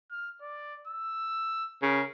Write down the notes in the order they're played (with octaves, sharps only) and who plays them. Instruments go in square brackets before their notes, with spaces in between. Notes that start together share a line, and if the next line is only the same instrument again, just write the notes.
[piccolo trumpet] F6
D5
E6
[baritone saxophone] C#3 [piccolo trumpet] A#4